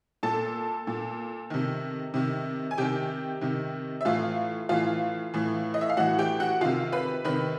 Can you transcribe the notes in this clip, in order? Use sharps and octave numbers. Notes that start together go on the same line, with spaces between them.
A#2 A4 A5
A#2
C3 D#3
C3 D#3
G#5
C3 D#3 G4 G5
C3 D#3
E5
A2 E3 F4 F5
A2 E3 F4 F5
A2 E3
D#5
E5
F5
A2 E3 F#4 F#5
G4 G5
F#4 F#5
C3 D#3 F4 F5
B4 B5
C3 D#3 B4 B5